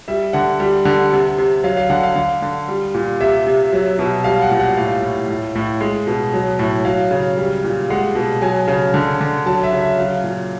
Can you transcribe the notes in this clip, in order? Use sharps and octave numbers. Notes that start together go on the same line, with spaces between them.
G3 E5
D3 F#5
G3
D3
C3
C3
F#3 F5
F5
D3 F#5
F5
D3 F5
D3
G3
A#2
C3 E5
C3
F#3
B2
G3 F5
F#5
A#2
F#5
A2 F5
A2
A2
A2
G#3
B2
F#3
A2
F#3 F5
C#3
G3
A#2
G#3 F#5
B2
F#3 G#5
C#3
D3
D3
F#3 A5
E5
C#3
E5
F#3 F5
A#2